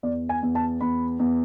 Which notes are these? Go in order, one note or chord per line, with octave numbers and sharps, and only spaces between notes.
E2 D5
G#5
E2
A5
E2 B5
E2